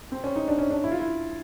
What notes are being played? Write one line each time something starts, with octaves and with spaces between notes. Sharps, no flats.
C4
C#4
D#4
D4
C#4
D4
E4
F4
E4